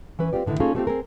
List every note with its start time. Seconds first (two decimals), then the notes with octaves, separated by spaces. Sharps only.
0.19 E3 C#4 B4
0.33 C4 D4 F4 G4 D5
0.46 A2 D3 D#3 E4
0.60 A#3 C#4 D#4 F4 G#4 A4
0.75 G3 A3 B3 C4 F4 G4
0.87 C4 G#4 A#4